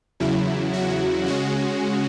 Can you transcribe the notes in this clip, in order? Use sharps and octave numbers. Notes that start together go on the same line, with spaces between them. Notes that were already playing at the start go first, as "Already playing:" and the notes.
E2 C#3 F#3 E4
F#4
C#3 G#3 C#4 F#4